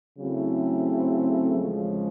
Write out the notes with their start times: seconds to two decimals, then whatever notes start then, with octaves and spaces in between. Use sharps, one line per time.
0.18 C#3 F#3 A3 C4 E4
1.57 E2 C#3 F3 G#3 C#4